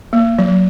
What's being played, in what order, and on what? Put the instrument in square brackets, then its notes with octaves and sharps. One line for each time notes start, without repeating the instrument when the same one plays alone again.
[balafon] A#3
F#3